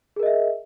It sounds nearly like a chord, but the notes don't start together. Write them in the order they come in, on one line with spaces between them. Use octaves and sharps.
G#4 A#4 D#5 E5